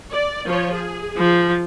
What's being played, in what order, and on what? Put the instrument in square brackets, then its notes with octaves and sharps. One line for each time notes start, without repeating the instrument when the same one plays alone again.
[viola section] D5
F3 C#5
G#4
[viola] F3